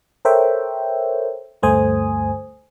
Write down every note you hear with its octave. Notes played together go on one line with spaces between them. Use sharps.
A4 A#4 C5 C#5 E5 G5
D2 G2 A3 C5 G#5 D#6